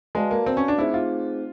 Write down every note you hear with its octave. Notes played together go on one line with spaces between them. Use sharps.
G#3 F#4 B4 D5 F5 A5
A#3
C4
C#4
D4
A3 C4 D#4 E4 G#4 C5
F4